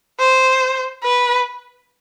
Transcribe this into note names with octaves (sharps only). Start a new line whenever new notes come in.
C5
B4